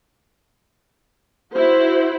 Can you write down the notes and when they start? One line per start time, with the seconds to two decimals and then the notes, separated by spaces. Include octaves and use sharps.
1.53 E4 F#4 C5